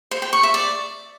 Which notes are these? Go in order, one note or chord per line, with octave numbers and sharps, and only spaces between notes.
C5
G5
C#6
E5
D5